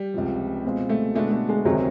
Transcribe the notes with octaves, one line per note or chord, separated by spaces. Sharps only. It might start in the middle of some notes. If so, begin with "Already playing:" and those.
Already playing: G3
C#2 C3 F3
B2 G#3 C4 F4
A3
B2 G#3 A3 B3 D4 F#4
A3
G#3
D2 C3 D#3 F#3 G#3 C4